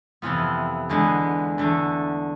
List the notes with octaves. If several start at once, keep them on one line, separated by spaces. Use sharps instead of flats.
F2 C3 E3 B3 F4
E2 D3 G#3 B3
E2 D3 A3